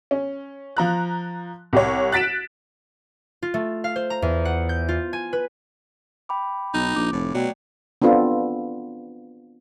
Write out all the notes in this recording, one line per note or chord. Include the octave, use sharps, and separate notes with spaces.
C#4
F3 A#5 F#6
C2 G4 C#5
F#6 A6 B6 D7 E7
F4
A3
F5
C5
A#5
E2
F#5
G6
F4
G#5
B4
G5 B5 D6
B1 D#4
A#1 D6
F1 A2
B2 F#3 A3 D5 G5
B3 C4 D4 F4 A4